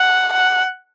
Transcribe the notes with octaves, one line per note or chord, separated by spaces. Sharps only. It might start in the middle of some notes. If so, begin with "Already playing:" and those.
Already playing: F#5
F#5